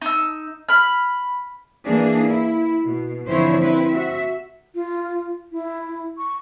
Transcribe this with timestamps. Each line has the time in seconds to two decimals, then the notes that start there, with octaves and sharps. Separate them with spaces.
0.02 D#4 E6
0.69 B5 F6
1.85 E3 A#3 D4 G#4
2.25 E4
2.84 B2
3.28 F2 D3 E3 E4 C5 C#5
3.61 C4 E4 B4
3.90 F#4 E5
4.75 F4
5.52 E4
6.18 C#6